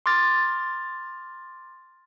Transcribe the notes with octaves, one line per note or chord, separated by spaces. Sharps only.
C6 D6 F6 A6